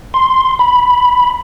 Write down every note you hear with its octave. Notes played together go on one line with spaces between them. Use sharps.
C6
B5